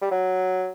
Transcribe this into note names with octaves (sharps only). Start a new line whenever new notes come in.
G3
F#3